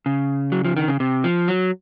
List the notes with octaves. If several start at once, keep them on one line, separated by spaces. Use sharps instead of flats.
C#3
F#3
F3
D#3
C#3
C3
F3
F#3